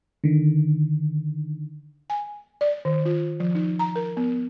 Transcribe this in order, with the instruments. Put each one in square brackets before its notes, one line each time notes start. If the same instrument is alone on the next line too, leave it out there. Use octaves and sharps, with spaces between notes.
[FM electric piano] D3 D#3
[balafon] G#5
D5
D#3
F4
F3
D#4
A#5
A#4
B3